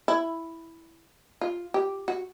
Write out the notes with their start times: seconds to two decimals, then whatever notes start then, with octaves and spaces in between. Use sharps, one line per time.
0.08 E4
1.41 F4
1.74 G4
2.08 F#4